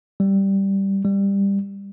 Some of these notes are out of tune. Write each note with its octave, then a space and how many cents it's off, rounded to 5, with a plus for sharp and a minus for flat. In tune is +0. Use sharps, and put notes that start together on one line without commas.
G3 -5
G3 +15